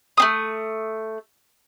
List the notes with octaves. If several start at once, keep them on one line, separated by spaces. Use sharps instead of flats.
A3 C4 D#6